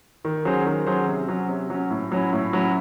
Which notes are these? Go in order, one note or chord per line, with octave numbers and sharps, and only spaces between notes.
D#3
F#3 C#4 G#4 C5
D#3
F#3 C#4 G#4 C5
C3
F#3 C#4
C3
F#3 C#4
A2
F#3 C#4 E4
A2
F#3 C#4 E4